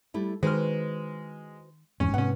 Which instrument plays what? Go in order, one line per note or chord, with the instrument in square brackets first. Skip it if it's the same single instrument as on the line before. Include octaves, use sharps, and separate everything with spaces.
[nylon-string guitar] G3 A3 E4
[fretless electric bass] D#3 [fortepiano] G#3 F6 [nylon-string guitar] F#4 B4 C5
[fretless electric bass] F1 E2 G#2 [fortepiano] C#4
[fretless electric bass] G#2 C3 [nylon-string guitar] B3 [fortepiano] C#4 F#5